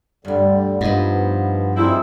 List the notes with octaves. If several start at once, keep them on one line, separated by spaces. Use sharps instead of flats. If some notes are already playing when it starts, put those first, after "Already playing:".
D2 G2 D3 G3
G2 F3 B3 D#4 B4
F3 G3 C4 D#4 E4 G#4